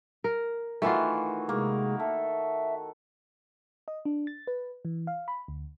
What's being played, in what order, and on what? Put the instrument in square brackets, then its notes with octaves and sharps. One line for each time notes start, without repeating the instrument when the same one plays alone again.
[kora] A#4
[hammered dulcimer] D#3 E3 F#4 [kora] A3 F4
[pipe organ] C3 G#3 G#4 [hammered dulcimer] A#3
[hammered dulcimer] A4 [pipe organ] E5
[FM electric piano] D#5
D4
A6
B4
E3
F5
B5
D2